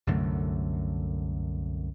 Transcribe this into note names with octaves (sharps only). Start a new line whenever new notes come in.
C2 F#2 D3 A3